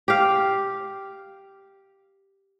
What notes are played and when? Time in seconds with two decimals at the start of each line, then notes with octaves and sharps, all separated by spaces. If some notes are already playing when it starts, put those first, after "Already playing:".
0.08 G4 F5